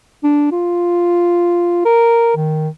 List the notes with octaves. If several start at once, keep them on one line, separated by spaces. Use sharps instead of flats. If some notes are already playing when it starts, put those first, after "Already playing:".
D4
F4
A#4
D#3